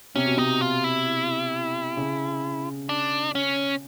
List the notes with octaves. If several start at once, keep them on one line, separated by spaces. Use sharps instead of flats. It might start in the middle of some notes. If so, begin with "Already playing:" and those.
C3 C#4
B2
C3 D#4
F4
E4
C#3
D4
C#4